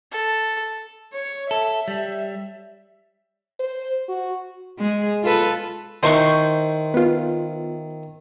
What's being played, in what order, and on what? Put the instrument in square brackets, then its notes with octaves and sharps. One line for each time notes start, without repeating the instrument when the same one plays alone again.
[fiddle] A4
[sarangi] C#5
[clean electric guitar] A4 [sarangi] E5
[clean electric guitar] G3
[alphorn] C5
F#4
[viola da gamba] G#3 G#4
F4 A4 B4
[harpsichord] D#3 E4 [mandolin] C5 C#6 G6
[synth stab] B3 F4